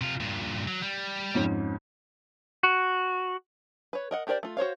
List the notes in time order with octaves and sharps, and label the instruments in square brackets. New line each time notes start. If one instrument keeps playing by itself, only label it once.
[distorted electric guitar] C3 F4
G2 A#2
F#3
G3
[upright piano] F2 G#2 C#4
[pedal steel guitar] F#4
[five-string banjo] B4 C#5
A#4 D#5 F#5
D4 G4 A#4 C5 D5
A3 F4
F#4 C5 C#5 F5